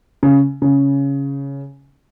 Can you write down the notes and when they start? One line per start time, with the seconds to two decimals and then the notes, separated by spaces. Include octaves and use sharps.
0.23 C#3
0.62 C#3